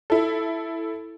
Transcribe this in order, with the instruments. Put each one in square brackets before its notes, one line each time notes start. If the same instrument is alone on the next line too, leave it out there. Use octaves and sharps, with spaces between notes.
[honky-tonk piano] E4 A4